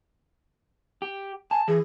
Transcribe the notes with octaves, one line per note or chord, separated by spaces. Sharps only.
G4
G#5 A5
E3 G#4